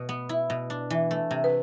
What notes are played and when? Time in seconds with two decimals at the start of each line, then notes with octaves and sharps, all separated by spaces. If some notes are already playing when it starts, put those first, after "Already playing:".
Already playing: B2
0.09 B3
0.29 E4
0.50 B2
0.70 D4
0.90 E3
1.11 A3
1.31 C3
1.44 B4